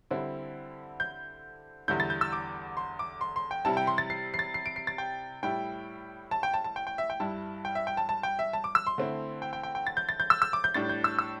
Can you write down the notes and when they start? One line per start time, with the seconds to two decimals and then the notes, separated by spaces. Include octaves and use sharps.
0.11 D3 G3 C4 E4
1.00 G6
1.88 E2 D3 G3 E4 G6
2.00 A6
2.10 G6
2.21 E6
2.33 D6
2.77 C6
2.99 D6
3.21 C6
3.36 C6
3.51 G5
3.65 C3 G3 E4 A5
3.77 G5
3.87 C6
3.98 A6
4.10 C7
4.34 C7
4.39 A6
4.54 C7
4.66 D7
4.76 C7
4.87 A6
4.98 G5
5.43 A2 G3 E4 G5
6.31 A5
6.43 G5
6.54 A5
6.64 A5
6.76 G5
6.87 G5
6.98 E5
7.10 G5
7.20 G2 G3 E4 A5
7.65 G5
7.75 E5
7.87 G5
7.97 A5
8.09 A5
8.23 G5
8.39 E5
8.53 A5
8.64 D6
8.75 E6
8.87 C6
8.98 D3 A3 C4 E4
9.42 G5
9.53 G5
9.63 G5
9.75 G5
9.87 A6
9.97 G6
10.09 A6
10.20 G6
10.30 E6
10.42 E6
10.53 D6
10.64 G6
10.74 A2 G3 D4 A6
10.89 G6
11.04 E6
11.19 E6